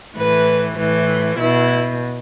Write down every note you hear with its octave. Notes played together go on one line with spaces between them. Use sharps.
A2 E3 B4
A2 E3
B2 E4